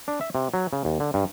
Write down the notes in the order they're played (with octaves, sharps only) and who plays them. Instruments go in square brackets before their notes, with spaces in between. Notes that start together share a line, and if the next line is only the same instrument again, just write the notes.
[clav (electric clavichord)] D4
E5
C3
F#3
C#3
D#2
D3
G2